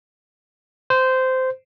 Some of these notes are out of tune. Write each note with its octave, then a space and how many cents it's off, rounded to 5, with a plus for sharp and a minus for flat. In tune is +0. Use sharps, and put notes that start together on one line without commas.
C5 -15